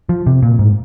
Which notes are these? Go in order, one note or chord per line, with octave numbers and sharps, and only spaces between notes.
F3
C3
A#2
G#2